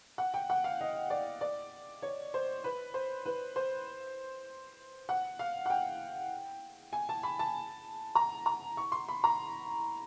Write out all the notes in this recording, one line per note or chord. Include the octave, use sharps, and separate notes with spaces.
F#5
G5
F#5
F5
D#5
D5
D5
C#5
C5
B4
C5
B4
C5
F#5
F5
F#5
G5
G#5
A5
B5
A5
A#5
A#5
C#6
C6
B5
A#5